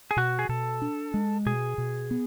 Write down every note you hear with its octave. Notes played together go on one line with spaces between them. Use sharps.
G#4
B2 F#4
G#4
B2 A4
D4
G#3
B2 G#4
B2
B3